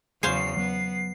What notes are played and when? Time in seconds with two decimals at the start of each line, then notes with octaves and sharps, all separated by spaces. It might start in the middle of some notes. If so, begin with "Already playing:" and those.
0.23 E2 C#3 F#3 C5 F5 G#5 C7
0.57 F#3 B3